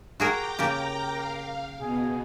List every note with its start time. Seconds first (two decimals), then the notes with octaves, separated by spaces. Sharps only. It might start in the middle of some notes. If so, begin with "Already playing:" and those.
0.20 F#4 G#4 A#4 G5 A#5 D6
0.59 C#3 A#3 G4 A#4
1.13 F5
1.79 B2 G#4